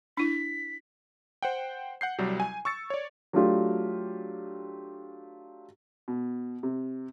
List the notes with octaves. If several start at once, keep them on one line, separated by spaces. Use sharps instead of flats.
D4 E4 B6
C5 F#5 G5
F#5 G6 C7
C2 F#3 G3
G#5
C#6 E6 A6 C#7
C#5 D5
F#3 A3 D4 F4 G4
B2
C3